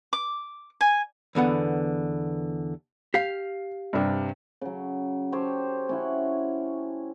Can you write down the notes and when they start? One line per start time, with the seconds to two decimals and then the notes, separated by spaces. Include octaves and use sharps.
0.13 D6
0.81 G#5
1.35 E2 D3 B3 F#5
3.14 G4 F5 C7
3.93 G2 C3 D4
4.61 C#3 F#3
5.32 G4 A4 C5 C#5
5.89 C#4 E4 F#5